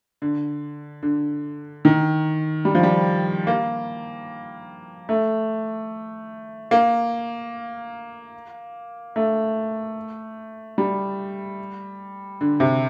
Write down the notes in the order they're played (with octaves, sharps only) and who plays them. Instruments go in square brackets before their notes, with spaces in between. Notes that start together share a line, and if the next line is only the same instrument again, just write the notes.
[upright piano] D3
D3
D#3
G3
F3
G3
A#3
A3
A#3
A3
G3
D3
C3